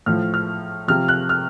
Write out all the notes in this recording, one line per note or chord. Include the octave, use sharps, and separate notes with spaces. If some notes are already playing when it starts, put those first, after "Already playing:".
A2 F3 F6
F6
C3 F3 F6
F#6
F6